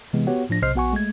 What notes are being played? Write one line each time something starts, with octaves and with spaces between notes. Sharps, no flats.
C3 E3 G#3 B3
B3 F#4 G4 C#5 F#5
A2 F3 D4 A#6
B1 C3 C5 D#5 F6 C7
A#1 B3 F#4 F#5 G#5 C#6
G#3 A3 G#6